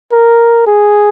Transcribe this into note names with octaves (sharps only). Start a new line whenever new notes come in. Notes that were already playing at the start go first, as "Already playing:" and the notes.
A#4
G#4